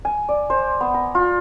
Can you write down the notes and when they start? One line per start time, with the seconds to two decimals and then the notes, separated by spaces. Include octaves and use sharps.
0.05 G#5
0.29 D5
0.50 C5
0.81 B3
0.94 A#5
1.15 F4